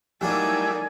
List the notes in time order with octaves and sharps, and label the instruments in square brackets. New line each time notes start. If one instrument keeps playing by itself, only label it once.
[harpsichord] F#3 A#3 [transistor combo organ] G3 A3 E4 [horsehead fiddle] D#4 D5 [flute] G#5